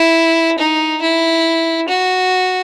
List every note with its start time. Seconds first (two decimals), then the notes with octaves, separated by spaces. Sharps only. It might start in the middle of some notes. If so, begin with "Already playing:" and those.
Already playing: E4
0.58 D#4
1.02 E4
1.88 F#4